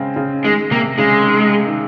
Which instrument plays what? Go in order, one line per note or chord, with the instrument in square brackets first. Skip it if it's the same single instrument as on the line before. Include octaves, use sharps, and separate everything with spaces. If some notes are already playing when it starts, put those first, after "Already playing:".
Already playing: [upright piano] C#3 G#3 C4
C#3
[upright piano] D#3 [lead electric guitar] G#3
[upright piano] C3 [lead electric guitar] A#3
[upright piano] C#3 [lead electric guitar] G#3
[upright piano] D#3
D#3